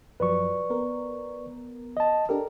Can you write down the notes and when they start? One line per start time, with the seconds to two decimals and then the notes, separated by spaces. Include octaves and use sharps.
0.20 F#2 F3 F#3 B4 D5 C#6
0.70 B3 A#4
1.97 D#5 A5
2.29 D4 G4 A4 A#4